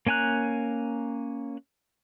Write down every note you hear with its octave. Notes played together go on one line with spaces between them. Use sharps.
A#3 C#4 G#5 A#5 F#6